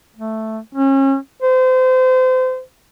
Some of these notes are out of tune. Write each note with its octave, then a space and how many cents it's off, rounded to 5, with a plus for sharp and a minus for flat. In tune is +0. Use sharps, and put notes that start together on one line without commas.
A3 +0
C#4 -35
C5 -30